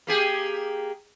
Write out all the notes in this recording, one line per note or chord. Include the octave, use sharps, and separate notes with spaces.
A#3 G4 G#4